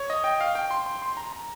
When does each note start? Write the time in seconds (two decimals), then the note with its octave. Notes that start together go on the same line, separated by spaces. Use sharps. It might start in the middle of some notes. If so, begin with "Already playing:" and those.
Already playing: C#5
0.10 D#5
0.24 G5
0.41 F5
0.55 G5
0.71 C6
0.86 C6
1.02 C6
1.17 A#5
1.33 A#5